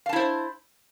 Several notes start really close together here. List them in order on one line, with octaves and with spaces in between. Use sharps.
F5 A5 E4 C5